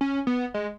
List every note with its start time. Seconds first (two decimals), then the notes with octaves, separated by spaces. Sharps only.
0.01 C#4
0.27 B3
0.54 G#3